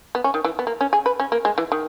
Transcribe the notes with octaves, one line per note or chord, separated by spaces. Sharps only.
B3
C#4
D#3
E3
B3
A#3
C#4
G#4
B4
C#4
A#3
G#3
E3
D#3